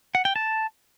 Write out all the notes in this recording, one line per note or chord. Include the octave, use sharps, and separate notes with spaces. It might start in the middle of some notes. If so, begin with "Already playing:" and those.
F#5
G5
A5